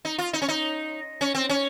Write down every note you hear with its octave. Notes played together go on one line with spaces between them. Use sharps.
D#4
F4
D#4
C#4
D#4
C#4
C4
C#4